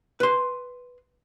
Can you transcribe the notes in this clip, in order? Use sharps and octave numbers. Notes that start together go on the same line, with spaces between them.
B4 C6